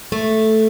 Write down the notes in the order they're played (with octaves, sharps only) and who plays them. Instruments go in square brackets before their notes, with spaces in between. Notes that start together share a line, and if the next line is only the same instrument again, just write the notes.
[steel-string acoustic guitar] A3